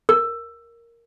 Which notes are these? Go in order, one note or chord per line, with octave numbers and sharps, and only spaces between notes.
A#4